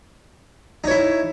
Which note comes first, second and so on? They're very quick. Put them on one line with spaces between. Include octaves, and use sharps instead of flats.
D#4 C#5 E4